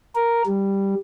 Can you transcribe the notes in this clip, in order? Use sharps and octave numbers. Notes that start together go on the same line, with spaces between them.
A#4
G3